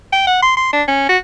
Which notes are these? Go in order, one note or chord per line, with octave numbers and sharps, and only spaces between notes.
G5
F#5
C6
C6
D4
C#4
F#4